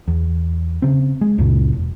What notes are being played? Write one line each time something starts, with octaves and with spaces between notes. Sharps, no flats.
E2
C#3 C4
G#3
C#2 F#2 A#2 C#3
E1